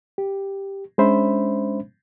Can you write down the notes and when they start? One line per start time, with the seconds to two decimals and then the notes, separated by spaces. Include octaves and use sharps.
0.18 G4
0.98 G#3 C#4 D4 C5 E5 B5